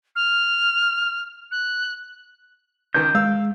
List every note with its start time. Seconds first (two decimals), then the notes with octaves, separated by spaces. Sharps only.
0.16 F6
1.51 F#6
2.94 C#2 D#3 G6
3.15 G#3 F5 E6